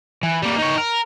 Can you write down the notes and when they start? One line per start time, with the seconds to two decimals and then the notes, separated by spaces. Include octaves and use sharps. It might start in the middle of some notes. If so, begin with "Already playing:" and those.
0.23 E3
0.42 G3 A#3
0.58 D#4 C#5
0.78 A#4